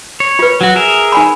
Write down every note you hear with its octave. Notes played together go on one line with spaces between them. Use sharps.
C#5
F4 B4
F#3 F#4
G#4 A#4 E5
D#4 G#5 B5